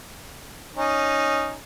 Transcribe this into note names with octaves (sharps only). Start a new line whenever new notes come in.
C#4 D#4